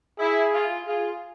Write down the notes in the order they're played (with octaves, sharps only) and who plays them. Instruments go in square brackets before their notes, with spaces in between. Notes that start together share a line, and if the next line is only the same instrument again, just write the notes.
[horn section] E4 [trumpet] G#4
[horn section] F4
[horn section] F4 [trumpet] G#4